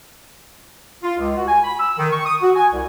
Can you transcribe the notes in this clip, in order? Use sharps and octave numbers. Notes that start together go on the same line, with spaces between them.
F4
C#2
F#4
G#5
B5
E6
D#3
C#6
D#6
F#4
G#5
C2